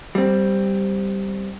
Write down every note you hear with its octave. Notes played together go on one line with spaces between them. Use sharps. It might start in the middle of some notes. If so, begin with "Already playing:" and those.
G3 C4